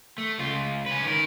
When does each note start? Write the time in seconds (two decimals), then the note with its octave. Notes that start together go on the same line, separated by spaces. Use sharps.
0.18 A3
0.38 C#2 F4
0.86 C#4 B4
1.05 D#3 A#4